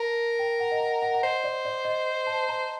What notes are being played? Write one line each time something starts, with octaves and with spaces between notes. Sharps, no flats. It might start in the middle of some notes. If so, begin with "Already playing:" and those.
Already playing: A#4 A5
G5
F#5
D#5
F#5
F#5
F#5
C5 D#5
D5
D5
D#5
A5
A#5